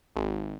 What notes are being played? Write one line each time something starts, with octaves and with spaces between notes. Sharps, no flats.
G#1